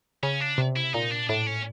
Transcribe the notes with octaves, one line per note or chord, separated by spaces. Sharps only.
C#3 C#4
D4
C3
E4
A#2 D#4
D4
A2 D4
C#4